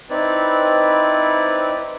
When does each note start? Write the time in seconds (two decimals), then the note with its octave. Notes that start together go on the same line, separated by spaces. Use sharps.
0.10 C4 D#4 E4 B4 D5